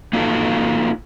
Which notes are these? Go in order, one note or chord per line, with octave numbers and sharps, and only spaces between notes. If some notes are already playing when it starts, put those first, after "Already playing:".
A#3 D#4 F4 F#4 A4 A5